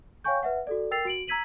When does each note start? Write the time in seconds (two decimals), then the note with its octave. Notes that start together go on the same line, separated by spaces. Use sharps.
0.24 C#5 F5 G5 G#5 C#6 G6
0.43 B4 E5 F#5
0.67 F#4 A4 D5
0.91 A#4 G5 E6 A6 C7 F7
1.05 F#4 D7 F#7
1.27 A#5 E6 G#6 B6 D#7 F#7